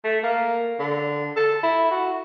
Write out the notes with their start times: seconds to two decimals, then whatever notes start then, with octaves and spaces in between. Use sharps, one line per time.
0.04 A3
0.24 A#3
0.79 D3
1.36 A4
1.63 E4
1.91 F#4